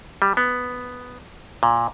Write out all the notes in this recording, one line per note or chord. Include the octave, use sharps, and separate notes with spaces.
G3
B3
A#2